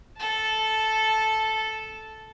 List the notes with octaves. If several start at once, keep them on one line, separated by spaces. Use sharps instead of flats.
A4 A5